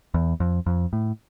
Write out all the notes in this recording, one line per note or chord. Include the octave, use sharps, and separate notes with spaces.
E2
F2
F2
A2